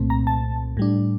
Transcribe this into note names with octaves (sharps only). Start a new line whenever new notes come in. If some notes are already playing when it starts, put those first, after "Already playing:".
Already playing: C2 A#2 A3 C4
A#5
A5
A2 G3 D4